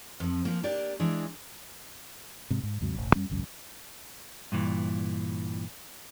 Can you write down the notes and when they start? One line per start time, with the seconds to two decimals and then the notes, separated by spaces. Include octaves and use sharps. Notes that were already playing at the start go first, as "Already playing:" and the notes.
0.20 F2 F3
0.45 F3 A#3
0.63 A#3 D4 G4 D5
1.00 E3 G#3 D4
2.50 G#2 C3
2.63 G#2
2.81 D#2 G#2 C3 F#3
2.94 E1 A1
3.15 F#2 G3 C#4
3.30 G#1 C#2 F#2
4.52 G2 A#2 E3